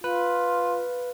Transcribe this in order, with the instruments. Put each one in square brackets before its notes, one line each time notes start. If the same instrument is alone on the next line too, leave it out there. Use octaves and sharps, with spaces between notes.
[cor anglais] F4 [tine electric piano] B4